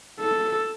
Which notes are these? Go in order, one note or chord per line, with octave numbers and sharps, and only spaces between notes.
A4